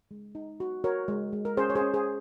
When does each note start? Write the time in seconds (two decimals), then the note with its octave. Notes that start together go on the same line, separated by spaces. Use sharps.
0.11 G#3
0.35 D#4
0.60 F#4
0.84 F#4 A#4 C#5
1.08 G#3
1.33 G#3
1.45 A#4
1.57 C#4 G#4 C5
1.70 C#5
1.75 G#4 C5
1.81 C#4
1.94 G#4 C5